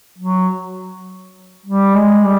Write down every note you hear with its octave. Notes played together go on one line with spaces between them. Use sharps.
F#3
G3
G#3
G3